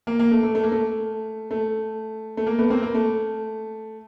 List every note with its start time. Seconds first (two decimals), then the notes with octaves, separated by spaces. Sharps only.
0.07 A#3
0.19 A#3
0.31 A3
0.43 A3
0.55 A3
0.63 A#3
0.72 A3
1.51 A3
2.37 A3
2.47 A#3
2.59 A3 B3
2.70 A#3 C4
2.83 A#3
2.94 A3